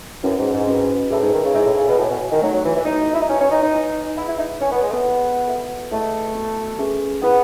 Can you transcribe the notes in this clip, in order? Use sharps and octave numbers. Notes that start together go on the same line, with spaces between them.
F#2 C#4 E4 B4 F#5
G#2
G#2
C#4 F#4 B4
A2 G#4 B4 E5 A5
G#2
D#3
C#3
G#2 E4 G#4 C#5 E5
A2
C#3
B2
A2 F#4 C#5 E5 G#5
B2
D#3
F#3 A3 D#4 A4 D#5
F#3
E3
E3
B3 D#4 F#4 A4 C#5
E4
D#4
C#4 F#4 B4 D#5 A5
C#4
D#4
D#4
E4 B4 D#5 G#5
E4 G#4 B4 F#5
E4
D#4
C#4 E4 B4 D#5 A5
B3
G#3
A3
B3
E4 G#4 D#5 A5
F#4 A4 E5
A3 E4 G#4 B4 D#5
B3 F#4 A4
C#4 G#4 B4 E5 A5
B3 E4 G#4 B4 D#5 F#5